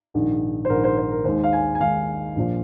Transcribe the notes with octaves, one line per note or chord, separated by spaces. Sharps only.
A#1 G#2 D#3
C5
A#1 G#2 D#3 A#4
C5
C5
A#4
D#2 D#3 G#3 C5
F5
G#5
G#5
D#2 D#3 G#3 F5
A#1 A#2 F3